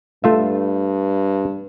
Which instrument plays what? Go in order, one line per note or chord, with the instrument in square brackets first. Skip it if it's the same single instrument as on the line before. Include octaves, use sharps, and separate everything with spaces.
[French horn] G2 [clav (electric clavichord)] A3 F4 E5